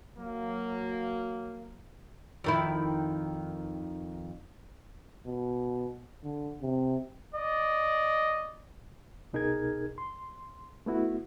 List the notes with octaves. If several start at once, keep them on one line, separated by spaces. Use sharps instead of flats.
F#3 A#3
F2 D#3 E4
B2
D3
C3
D5 D#5
C2 B2 D#4 G#4 A#4 G#6
C6
A3 B3 E4 F#4